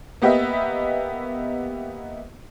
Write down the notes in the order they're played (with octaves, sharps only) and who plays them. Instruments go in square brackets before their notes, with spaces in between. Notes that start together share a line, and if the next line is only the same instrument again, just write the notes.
[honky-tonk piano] A#3 B3 G4 B4 D#5 E5